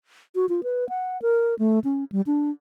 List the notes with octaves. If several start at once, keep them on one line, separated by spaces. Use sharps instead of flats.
F#4
F4
B4
F#5
A#4
A3
C#4
G3
D4